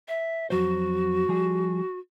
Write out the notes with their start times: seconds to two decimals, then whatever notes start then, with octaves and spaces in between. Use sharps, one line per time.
0.08 E5
0.50 F2 F#3 F#4 C5
1.29 F3 G3 G#4